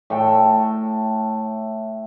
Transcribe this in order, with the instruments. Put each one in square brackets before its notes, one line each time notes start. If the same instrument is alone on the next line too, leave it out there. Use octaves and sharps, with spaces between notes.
[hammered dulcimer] A2 A3 A4 G5